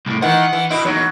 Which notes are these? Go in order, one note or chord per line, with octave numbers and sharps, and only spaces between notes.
C2 A2
D#3 E3 F#5
E3
E4 B4 D#5
E2 D#3 F#3